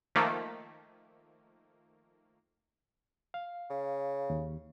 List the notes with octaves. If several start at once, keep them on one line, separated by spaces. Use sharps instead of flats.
D#3 F3 A3 A#3
F5
C#3
D#2